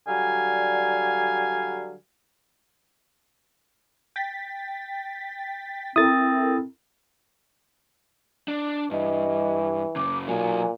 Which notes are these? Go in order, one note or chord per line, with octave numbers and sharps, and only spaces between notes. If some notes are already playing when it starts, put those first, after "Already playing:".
D3 F#3 G3 F5 G#5
G5 A6 B6
C4 E4 A4 A#4 D#6 A6
D4
G2 E3 D#5
F#2 C#3 D6
B1 A#2 F#3 G#5